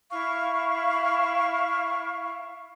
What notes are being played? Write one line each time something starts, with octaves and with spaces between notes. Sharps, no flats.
E4 F5 C#6